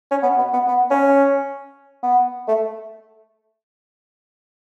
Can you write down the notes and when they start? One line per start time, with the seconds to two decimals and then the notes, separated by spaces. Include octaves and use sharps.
0.11 C#4
0.23 B3
0.38 B3
0.53 B3
0.67 B3
0.90 C#4
2.03 B3
2.48 A3